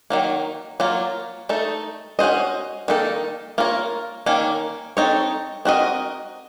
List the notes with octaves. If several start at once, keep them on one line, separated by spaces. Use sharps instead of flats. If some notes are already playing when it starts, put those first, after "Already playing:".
D#3 F#3 A#3
F#3 A#3 F4
A3 D#4 A4
C#4 F#4 C5 D#5
D#3 A#3 D#4 A4
A#3 F4 A#4 C#5
D#3 A#3 C#4
C4 D#4 A4 C#5
C4 F#4 A#4 D#5